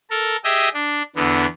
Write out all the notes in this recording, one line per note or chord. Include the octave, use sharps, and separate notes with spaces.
A4 A#4
G4 G#4 D#5 E5
D4
E2 D3 B3